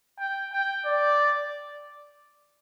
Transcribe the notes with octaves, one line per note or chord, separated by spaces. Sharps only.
G5
G5
D5